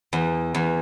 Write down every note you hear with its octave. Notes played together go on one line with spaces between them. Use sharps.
E2
E2